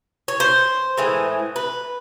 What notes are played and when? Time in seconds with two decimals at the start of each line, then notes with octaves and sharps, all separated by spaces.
0.28 C#5
0.40 C5
0.97 A2 E3 G#3
1.56 B4